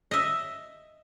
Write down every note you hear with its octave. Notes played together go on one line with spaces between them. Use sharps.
D#5 E5